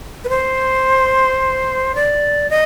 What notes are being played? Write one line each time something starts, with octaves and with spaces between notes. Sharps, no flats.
B4
C5
D5
D#5